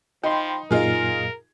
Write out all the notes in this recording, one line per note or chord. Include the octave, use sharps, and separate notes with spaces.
F3 D#4 G5 B5 C6
F#2 A#2 D#4 F4 G#4 A#4